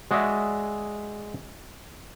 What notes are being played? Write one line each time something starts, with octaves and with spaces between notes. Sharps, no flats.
G#3 F#4 G#4 D5 E5